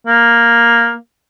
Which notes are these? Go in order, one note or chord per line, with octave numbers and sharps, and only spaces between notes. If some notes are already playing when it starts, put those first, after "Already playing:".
A#3